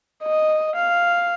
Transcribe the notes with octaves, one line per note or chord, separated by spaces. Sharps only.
D#5
F5